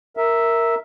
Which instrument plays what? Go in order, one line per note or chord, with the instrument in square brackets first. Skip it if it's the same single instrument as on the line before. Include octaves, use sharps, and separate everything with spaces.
[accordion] A#4 E5